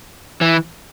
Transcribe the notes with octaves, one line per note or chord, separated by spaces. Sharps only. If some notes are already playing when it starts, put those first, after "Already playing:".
E3